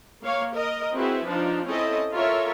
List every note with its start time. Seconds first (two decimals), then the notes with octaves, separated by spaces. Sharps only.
0.22 A#3 C#5 F5
0.54 A#4 D#5
0.95 C4 E4 F#4 G#4 B4
1.27 F3 D4 D#4 F4
1.66 C4 C#4 E4 A4 D#5
2.13 F4 A4 A#4 C#5 E5